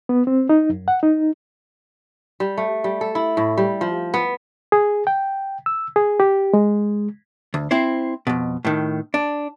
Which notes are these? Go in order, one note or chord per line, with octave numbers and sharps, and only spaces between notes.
B3
C4
D#4
F#2
F#5
D#4
G3
A3
G3
A4
E4
A2
G3
F3
B3
G#4
G5
E6
G#4
G4
G#3
D2
C4 E4 C5
F2 B2
A2 D#3
D4